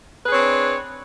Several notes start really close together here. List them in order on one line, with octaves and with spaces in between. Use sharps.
B4 G#4 C#5 C4 D4